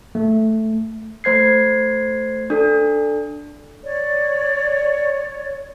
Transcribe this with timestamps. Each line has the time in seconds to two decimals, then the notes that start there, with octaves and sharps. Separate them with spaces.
0.15 A3
1.24 A3 C5 G#6 C7
2.50 D4 A4
3.85 C#5 D5